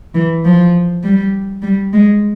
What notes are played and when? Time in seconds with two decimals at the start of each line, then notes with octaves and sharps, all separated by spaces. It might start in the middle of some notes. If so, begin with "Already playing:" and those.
0.15 E3
0.45 F3
1.04 G3
1.62 G3
1.93 G#3